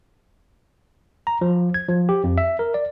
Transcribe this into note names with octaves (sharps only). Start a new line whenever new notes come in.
A#5
F3
G#6
F3
G4
F2
E5
A#4
D5